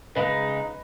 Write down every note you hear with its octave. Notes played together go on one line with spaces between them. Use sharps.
C#3 G#3 D#4 B4 D#5